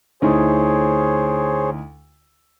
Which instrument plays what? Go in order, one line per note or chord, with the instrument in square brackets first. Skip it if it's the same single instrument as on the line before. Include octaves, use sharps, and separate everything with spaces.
[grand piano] D2 D#4 E4 [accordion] G#4 C5 C#5